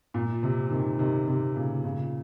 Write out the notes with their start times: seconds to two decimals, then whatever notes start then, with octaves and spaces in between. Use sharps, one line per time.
0.14 A#2
0.43 C3
0.70 C3 D#3
0.99 C3 D#3
1.28 C3
1.56 A#2 C#3
1.84 A#2 C#3